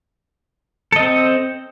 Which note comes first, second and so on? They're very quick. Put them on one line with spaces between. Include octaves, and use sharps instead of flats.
A4 D#5 C4